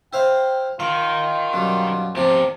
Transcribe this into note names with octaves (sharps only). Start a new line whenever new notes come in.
E4 C5 F5 G5
D#3 F4 F5
F#2 B2 G3
E2 C3 F3 G4 D6